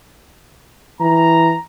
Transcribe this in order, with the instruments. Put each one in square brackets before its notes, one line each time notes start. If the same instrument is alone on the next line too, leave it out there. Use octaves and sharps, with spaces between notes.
[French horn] E3 [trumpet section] A#5